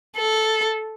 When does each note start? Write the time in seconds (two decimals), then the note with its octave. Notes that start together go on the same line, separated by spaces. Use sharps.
0.16 A4